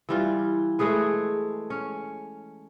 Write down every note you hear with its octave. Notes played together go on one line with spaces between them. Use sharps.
E3 G3 F4
G#3 A3 G#4 B4
C#4